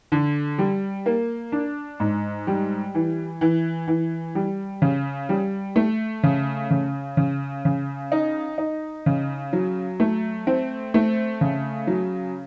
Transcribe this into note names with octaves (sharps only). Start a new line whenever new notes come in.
D3
G3
A#3
D4
G#2
G3
E3
E3
E3
G3
C#3
G3
A3
C#3
C#3
C#3
C#3
D#4
D#4
C#3
F#3
A3
C4
A3
C#3
F#3